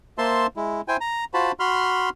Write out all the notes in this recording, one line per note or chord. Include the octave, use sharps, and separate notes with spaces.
A#3 C5 E5 A5 C6
G#3 E4
E4 C5 G5 G#5
A#5
F4 F#4 C5 A5 B5
F#4 B5 C6 F6